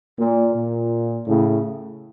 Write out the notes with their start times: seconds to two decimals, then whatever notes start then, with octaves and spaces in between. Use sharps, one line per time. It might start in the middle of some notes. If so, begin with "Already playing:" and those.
0.18 A#2
0.54 A#2
1.27 A2 C#3